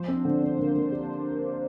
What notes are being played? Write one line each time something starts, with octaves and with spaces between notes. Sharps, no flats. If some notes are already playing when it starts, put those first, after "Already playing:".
Already playing: F3 C5
C4
D4
D3
C4
D3 A#3
D3
G4